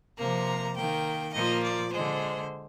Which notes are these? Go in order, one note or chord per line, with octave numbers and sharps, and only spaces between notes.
C3 F3 A#3 A#5
D#3 A#3 G5
A#2 F3 A#3 D#5
D5
D3 G#3 C5